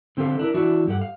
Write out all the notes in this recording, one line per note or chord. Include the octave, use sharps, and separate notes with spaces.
D3 C4 G4 A4 F5
D4 E4 A#4
E3 D4 E4 F#4
G2 G4 A4 F#5
F5